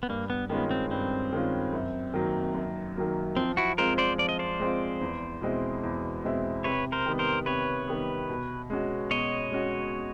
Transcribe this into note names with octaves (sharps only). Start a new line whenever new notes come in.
B3
G2 A#3
B3
D#3 G#3 B3 C#4 F4
C4
G2 C4
D#3 G#3 C#4 F4
F#2
D#3 F#3 A#3
F#2
D#3 F#3 A#3
F3 C4
E4 F#4
G#3 C4 F4 A#4 C5
C5 D5
F3 D5
D#5
C5 D5
G#3 C4 F4
E2
B2 G#3 C4 E4
E2
B2 G#3 C4 E4
C3 B4 C#5
A#4 C5
D#3 G3 B3
A#4 C5
C3 B4 C#5
D#3 G3 B3
B2
G#3 C#4 F#4
B2 C#5 D#5
G#3 C#4 F#4